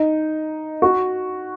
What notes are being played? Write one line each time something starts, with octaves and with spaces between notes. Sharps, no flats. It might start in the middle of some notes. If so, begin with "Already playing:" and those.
Already playing: D#4
F#4